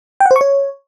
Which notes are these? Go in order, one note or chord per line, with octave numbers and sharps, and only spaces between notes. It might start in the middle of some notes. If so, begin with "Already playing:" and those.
G5
F#5
C5
C#6
C#5